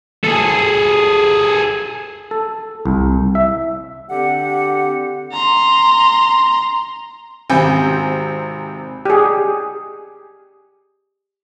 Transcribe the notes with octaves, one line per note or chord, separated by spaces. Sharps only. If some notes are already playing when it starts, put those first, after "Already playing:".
G#4 A4
A4
C2
E5
D3 C4 G4 F#5
A#5 C6
G#1 C3 C4 G#5 G6
G4 G#4